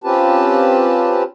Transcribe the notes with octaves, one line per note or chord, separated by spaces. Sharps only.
C4 C#4 F4 G4 B4 A5